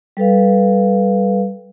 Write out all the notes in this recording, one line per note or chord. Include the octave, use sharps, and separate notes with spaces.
G3 A4 B4 F5